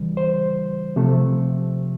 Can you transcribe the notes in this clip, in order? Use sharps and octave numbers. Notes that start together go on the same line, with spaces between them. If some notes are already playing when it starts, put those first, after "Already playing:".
Already playing: D2 C#3 E3 G3
C5
C3 F3 A3